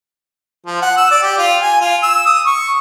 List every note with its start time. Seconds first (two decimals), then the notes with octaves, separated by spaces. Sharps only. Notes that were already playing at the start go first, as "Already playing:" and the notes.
0.66 F3
0.82 F#5
0.97 E6
1.11 D5
1.23 G4
1.38 F4
1.62 G#5
1.81 F4
2.03 E6
2.26 D#6
2.46 C#6